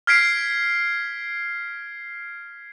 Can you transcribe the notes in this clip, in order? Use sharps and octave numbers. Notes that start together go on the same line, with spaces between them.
F6 G#6 B6 C7 D7